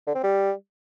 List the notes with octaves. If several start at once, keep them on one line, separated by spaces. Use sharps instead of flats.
D3
C4
G3